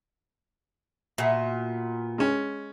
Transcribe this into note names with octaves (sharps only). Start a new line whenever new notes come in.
A#2 B3 F#4 E5
G#3 C#4